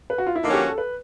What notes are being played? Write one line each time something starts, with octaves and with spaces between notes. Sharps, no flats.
B4
F#4
F4
E4
D3 F3 A#3 C#4 D#4 F#4
G4
A4
B4